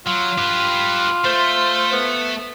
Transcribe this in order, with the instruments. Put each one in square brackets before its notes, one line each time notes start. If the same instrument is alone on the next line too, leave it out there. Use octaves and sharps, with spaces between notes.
[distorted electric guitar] F#3 [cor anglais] F4
[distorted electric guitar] G4 B4
[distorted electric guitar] A3 [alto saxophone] C5
[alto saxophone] B3